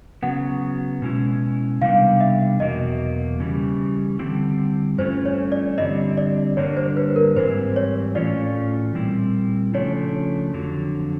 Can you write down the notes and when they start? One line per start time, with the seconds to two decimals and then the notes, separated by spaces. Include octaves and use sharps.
0.23 C#3 F#3 B3 F#5
1.02 B2 G#3 C#4 E4
1.82 C3 D#3 G3 B3 D4 F5
2.20 E5
2.60 E2 B2 F#3 A#3 D#5
3.40 C#3 E3 G3
4.19 D3 G3 C4 E4
4.98 G2 E3 A3 C#4 F4 C5
5.25 C#5
5.52 D5
5.78 D3 G3 C4 D#5
6.18 D5
6.57 G2 D3 G3 A#3 D4 C#5
6.77 C5
6.97 B4
7.16 A#4
7.36 G#2 E3 G3 C4 E4 C5
7.76 C#5
8.15 A2 E3 A3 C#4 F4 D5
8.95 A#2 G3 C4 E4
9.74 C#3 F3 A3 D4 C#5
10.53 F2 D3 F#3